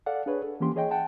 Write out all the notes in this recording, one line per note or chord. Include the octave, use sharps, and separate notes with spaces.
A4 D5 F5 F#5
D4 G#4 B4 C#5
A4
E3 A#3 C#4 G4 C6
G#4 C#5 D#5 G5
F#5 G5 A5